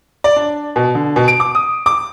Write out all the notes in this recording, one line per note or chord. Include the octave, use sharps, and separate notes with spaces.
D5
D4
B2
D3
B2
D7
D6
D#6
D6